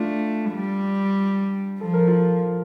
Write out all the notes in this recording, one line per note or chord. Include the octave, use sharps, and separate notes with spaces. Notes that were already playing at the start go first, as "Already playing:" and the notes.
Already playing: A3 D4 F4
G3
F3 A4
A#4
F4 A4